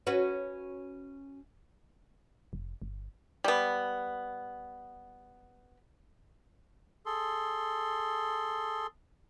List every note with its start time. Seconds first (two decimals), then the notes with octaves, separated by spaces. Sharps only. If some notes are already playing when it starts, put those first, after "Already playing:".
0.07 C#4 F#4 B4
2.53 F1
2.82 G1
3.44 G3 B3
7.06 G#4 A4 C6